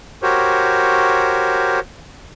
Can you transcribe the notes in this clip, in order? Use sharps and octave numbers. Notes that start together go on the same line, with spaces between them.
F#4 G4 A#4 C5 C#5